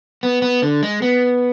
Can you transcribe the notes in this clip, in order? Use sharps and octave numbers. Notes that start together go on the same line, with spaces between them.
B3
B3
D3
G#3
B3